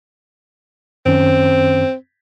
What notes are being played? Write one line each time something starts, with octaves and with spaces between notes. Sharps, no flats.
F#2 D#3 C4 C#4